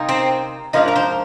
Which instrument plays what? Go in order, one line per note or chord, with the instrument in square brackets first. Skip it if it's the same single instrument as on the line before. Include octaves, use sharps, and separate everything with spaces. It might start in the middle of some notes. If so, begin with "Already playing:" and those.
Already playing: [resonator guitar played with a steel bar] C3 G3 A#3 D#4
[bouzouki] C4
[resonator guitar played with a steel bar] G#2 F3 A#3 D4 [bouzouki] D#4
[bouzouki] A#4
C5